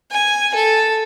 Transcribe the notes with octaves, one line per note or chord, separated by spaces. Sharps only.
G#5
A4